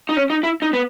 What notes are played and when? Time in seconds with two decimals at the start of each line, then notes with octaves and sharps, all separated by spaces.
0.09 D#4
0.17 C#4
0.30 D#4
0.43 E4
0.62 D#4
0.73 B3